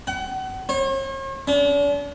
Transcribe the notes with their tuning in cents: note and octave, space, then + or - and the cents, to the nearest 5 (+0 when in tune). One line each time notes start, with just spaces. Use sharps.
F#5 +35
C#5 -45
D4 -45